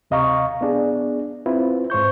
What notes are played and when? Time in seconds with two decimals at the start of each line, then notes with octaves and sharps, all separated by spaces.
0.10 D2 C3 D#5 F5 A#5 C#6
0.61 B3 D4 G#4
1.46 C4 E4 F4 B4
1.90 G#2 C5 C#6 G6